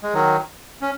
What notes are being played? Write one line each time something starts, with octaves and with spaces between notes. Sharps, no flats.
G#3
D#3 F#3
C#4